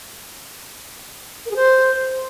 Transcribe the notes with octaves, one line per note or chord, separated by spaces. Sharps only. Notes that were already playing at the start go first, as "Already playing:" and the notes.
A#4
G#4
C5